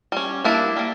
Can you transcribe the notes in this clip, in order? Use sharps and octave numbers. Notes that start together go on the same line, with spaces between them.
G3 C#4
G3 A#3 D4 E4
G3 A#3